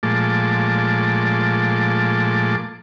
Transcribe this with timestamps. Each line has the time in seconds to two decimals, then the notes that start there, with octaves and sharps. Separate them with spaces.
0.03 A#2 F3 G#3 A3 A5 D6